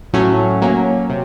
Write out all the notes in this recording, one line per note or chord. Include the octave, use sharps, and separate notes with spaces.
A2 F#3 A3 C#4
F#3 A#3 C#4
C3